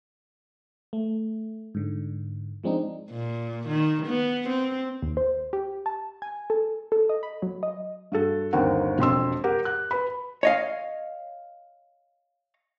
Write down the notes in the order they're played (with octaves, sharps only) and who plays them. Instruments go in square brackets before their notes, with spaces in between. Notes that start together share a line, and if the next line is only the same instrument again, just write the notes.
[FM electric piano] A3
G#2 D3
F3 G#3 C4 D4 D#4
[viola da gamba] A#2
D#3
B3
C4
[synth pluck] D#2
C5
G4
A5
G#5
A4
A4
D#5
B5
F#3
D#5
[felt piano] G2 F#4 A4
G1 D#2 C4 A#4 F#5
E1 F2 C6 E6
G4 A#4 F#5
F#6
B4 B5
[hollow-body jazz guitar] C#5 D#5 F5